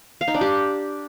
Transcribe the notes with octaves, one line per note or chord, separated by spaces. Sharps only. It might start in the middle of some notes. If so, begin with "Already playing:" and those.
F5
D#4
D4
G4